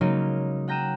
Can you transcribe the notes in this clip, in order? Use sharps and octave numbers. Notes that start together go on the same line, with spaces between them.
C#3 F#3 G#3 A#3 C#4 D#4
F#5 G5 A#5 F6 D#7 E7